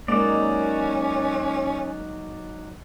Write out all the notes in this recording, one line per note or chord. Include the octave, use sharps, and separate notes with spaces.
F#3 G#3 A#3 C#4 D#4 D5